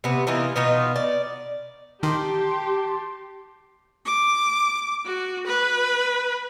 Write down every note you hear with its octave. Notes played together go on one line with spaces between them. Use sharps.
C3 B3
E3 A#3 D#4 F4
B2 B3 D#4 F4
D5
D#3 G4 A5 C6
D6
F#4
B4